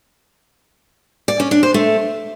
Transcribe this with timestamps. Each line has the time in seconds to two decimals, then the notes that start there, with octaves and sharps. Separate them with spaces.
1.28 D5
1.40 C#4
1.51 D4
1.63 C5
1.74 A3